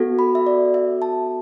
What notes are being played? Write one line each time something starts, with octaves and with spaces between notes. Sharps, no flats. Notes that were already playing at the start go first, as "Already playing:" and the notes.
Already playing: B3 F#4 A4
B5
E5
D5
E5
A5